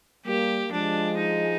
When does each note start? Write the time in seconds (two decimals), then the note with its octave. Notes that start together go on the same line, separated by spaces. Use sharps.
0.25 G3 A#3 G4
0.72 F3 G#3 D4
1.18 D#4